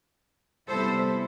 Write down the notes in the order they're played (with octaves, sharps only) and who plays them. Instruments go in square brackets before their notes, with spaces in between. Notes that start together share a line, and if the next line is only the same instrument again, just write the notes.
[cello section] C3 G3 B3 E4 A4 C5